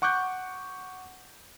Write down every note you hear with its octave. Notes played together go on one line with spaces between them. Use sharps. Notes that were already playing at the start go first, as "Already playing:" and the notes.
F#5 C#6 D6 F#6 G6